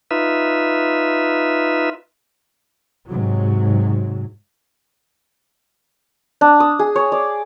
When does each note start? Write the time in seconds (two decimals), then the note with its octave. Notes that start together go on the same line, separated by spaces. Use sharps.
0.11 D#4 F4 B4 E5
3.07 G#2 C3 F#3
6.41 D4
6.60 D#6
6.79 G#4
6.96 C#5
7.12 D5